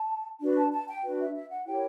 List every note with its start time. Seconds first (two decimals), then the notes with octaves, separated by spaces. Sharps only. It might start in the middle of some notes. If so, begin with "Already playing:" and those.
Already playing: A5
0.40 D4 F#4 B4
0.56 A5
0.72 A5
0.88 G5
1.03 D4 F#4 B4
1.19 E5
1.34 E5
1.50 F#5
1.66 E4 G4 A#4 C#5 G5